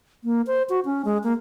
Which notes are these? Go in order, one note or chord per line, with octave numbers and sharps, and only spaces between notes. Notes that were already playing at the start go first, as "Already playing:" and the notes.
A#3
C5
F#4
C#4
G#3
A#3